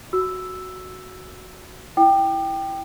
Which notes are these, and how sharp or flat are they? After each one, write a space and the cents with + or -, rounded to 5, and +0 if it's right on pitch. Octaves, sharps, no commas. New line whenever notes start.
F#4 +0 E6 +0
E4 +0 G5 +0 D6 +40